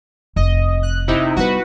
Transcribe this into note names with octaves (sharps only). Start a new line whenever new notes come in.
F1 D#5
F#6
C3 D#4 E4
G3 B3 F#4 B4